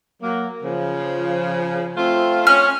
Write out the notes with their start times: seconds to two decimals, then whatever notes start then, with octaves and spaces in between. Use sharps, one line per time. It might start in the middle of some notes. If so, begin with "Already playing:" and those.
0.22 F#3 A#3
0.63 C#3 F3
1.96 A3 C4 F4
2.47 C#4 F6